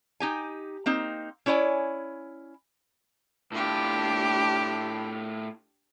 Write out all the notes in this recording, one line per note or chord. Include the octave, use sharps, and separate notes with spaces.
D#4 G4 G#5
A#3 C4 D#4
C#4 E4 C#5 D5 G#5
A2 D4 F4 G4